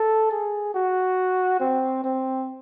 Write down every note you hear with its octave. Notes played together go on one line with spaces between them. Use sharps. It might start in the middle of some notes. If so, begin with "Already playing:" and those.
Already playing: A4
G#4
F#4
C4
C4